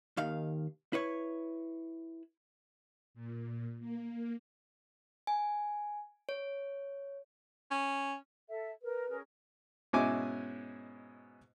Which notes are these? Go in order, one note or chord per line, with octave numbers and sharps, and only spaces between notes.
D#2 D#3 F5
E4 B4 C#5
A#2
A#3
G#5
C#5
C#4
A4 E5
A#4 B4
C#4 G#4 A#4
G#2 B2 C#4 E4 G#5 D6